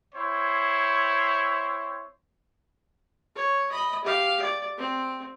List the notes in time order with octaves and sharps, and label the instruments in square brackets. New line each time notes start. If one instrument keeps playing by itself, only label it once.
[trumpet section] C4 E4 C5 C#5
[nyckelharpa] C#5
D#5 B5
G4 F5
D5
C4